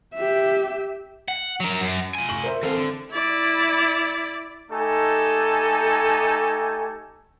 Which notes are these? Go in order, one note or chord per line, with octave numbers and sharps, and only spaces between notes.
G4 E5
F#5
F#3 A#4
F#2
F4 G#5
C#6 F#7
A#4 C5 E5
E3 C4 A4 F5
D3
E4 D5
A3 D#4 G4 A4 G#5